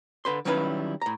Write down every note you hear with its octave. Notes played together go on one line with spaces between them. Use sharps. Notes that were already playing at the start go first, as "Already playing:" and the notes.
D3 B4 C6
D#3 F#3 G3 C#4 E4 B4
A2 A#5